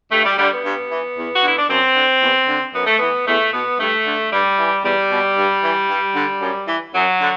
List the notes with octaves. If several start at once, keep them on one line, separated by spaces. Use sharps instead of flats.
G2 A3
G3
D3 G3
B3
G2
E3
E2
F#4
D3 E4
D4
F#2 C4
D3
E2
D3
F#2 B3
A3
E3 B3
E2 A3
B2 B3
G2 A3
D3
G2 G3
E3
E2 G3
B2
G2
E3
G2
D3
F#2
E3
F#2 F#3
D3